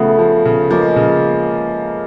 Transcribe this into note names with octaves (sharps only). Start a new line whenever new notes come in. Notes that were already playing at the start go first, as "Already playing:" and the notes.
Already playing: C#3 F3 A3 B3
F3
C#3
F3 G#3 A#3
C#3